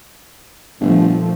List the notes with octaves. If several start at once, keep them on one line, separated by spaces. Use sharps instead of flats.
G1 A#2 F3 A3